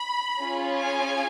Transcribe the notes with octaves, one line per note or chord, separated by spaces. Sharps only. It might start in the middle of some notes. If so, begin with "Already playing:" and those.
Already playing: B5
C#4 F4 G#4
G#5